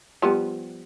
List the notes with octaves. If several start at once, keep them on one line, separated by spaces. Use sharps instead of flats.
F3 G3 B3